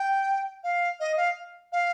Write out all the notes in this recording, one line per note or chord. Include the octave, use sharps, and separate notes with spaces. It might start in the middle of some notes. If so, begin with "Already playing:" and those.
Already playing: G5
F5
D#5
F5
F5